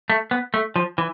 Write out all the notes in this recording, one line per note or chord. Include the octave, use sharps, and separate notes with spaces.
A3
B3
A3
F3
E3